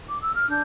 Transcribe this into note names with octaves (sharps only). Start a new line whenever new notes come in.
D6
E6
F6
D4 G6